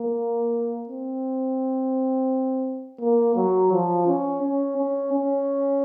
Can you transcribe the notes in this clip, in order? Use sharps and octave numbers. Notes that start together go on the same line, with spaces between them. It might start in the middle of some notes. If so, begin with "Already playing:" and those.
Already playing: A#3
C4
A#3
F#3
F3
C#4
C#4
C#4
C#4